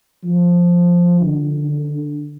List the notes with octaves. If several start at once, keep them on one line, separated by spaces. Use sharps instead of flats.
F3
D3